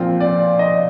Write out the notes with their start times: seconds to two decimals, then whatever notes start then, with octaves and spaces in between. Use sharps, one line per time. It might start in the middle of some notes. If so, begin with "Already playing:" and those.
Already playing: A#2 F3 C4 F4
0.20 D5
0.59 D#5